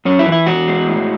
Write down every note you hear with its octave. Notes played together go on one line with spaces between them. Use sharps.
F#2 C#4
E4
E3
E4
E2 F#4
G#3
A2